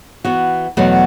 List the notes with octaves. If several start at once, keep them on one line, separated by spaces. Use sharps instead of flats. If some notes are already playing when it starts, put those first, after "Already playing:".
E3 B3 F#4
E2 B2 F#3 A3 F#4